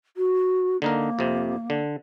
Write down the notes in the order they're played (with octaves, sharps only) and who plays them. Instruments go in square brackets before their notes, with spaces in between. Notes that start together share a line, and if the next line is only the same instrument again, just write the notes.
[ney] F#4
[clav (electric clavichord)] D3 D#4 A#4 [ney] A#3
[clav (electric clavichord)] F2 C3
D3